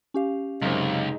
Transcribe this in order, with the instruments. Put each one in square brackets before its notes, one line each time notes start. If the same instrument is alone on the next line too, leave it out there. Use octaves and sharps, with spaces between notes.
[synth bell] C#4 G4 F5
[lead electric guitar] C#2 [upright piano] F#2 C3 C4 [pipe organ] G#3 D#4